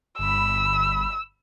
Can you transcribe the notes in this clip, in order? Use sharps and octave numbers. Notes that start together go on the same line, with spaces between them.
G1 B5 E6